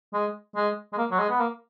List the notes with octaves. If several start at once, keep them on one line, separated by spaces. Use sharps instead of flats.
G#3
G#3
G#3
A#3
F#3
G#3
B3
A#3